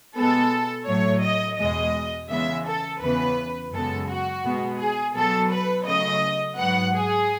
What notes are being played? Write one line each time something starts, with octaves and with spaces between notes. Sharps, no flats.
B2 G#3 B3 A4
A2 F#3 A3 C#5
D#5
E2 B2 G#3 D#5
C#3 E3 G#3 B3 E5
A4
E2 C#3 E3 B3 B4
F#2 C#3 G#3 B3 A4
F#4
B2 G#3 B3
G#4
B2 F#3 B3 A4
B4
C#3 F#3 A3 D#5
G#2 F#3 B3 F#5
G#4